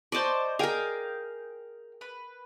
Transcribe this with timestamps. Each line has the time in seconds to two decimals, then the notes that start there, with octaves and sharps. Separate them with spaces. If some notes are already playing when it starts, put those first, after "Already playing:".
0.12 C5 D5 D#5 A5 C#6
0.59 G#4 A#4 F5 G5
2.01 B4